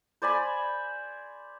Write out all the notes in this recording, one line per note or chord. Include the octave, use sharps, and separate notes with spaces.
C5 D5 G#5 B5